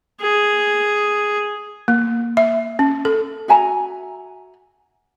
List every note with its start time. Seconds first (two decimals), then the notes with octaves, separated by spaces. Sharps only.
0.21 G#4
1.88 A#3
2.37 E5
2.79 C#4
3.05 A4
3.48 F#4 E5 G#5 A#5